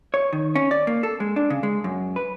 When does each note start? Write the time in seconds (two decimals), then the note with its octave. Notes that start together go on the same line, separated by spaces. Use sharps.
0.14 C#5
0.33 D#3
0.56 C#4
0.71 D5
0.87 A#3
1.03 A4
1.20 G#3
1.36 D4
1.50 C#3
1.63 G#3
1.84 F#2
2.16 B4